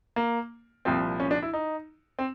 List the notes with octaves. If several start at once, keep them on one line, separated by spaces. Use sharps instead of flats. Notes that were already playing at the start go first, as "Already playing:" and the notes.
A#3
C2 A#2 F3 C4
C#4
D4
E4
D#4
C4